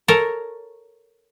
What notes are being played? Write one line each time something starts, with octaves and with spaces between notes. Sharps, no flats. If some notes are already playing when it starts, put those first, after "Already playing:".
A4 A#4 C#5